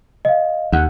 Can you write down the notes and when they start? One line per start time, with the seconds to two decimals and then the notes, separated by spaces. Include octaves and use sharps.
0.25 D#5 F5
0.72 D#2 F#5